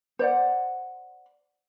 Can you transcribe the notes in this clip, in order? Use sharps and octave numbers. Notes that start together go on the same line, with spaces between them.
C5 D5 F#5